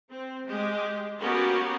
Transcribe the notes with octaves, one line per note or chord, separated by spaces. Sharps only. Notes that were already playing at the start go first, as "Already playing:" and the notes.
C4
G#3 G4
A#3 B3 C#4 F#4 G4 A#4